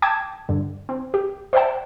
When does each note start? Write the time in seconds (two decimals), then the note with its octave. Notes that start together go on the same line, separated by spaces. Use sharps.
0.02 G5 A5 D6 G#6
0.49 G2 D3
0.89 C4
1.14 G4
1.53 C5 D5 E5 F#5 G5 A5